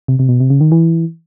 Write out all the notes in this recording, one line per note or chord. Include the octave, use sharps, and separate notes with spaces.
C3
C3
B2
C3
C#3
D#3
E3